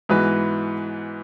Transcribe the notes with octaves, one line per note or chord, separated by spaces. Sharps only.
G#2 E3 B3 F#4 B4